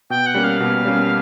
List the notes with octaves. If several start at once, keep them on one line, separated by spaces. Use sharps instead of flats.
B2 G5
F#5
G3 A#3 C#4
F5
B2
G3 A#3 C#4